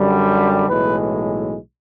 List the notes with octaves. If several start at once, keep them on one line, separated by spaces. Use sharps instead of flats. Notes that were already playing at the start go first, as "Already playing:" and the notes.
Already playing: F#2 D3 G3
B1 A2 E3 G#3 B4